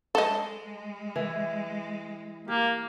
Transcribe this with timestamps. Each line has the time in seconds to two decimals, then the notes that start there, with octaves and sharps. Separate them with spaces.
0.15 G#3 A4 D#5
1.16 E3
2.48 A#3 G4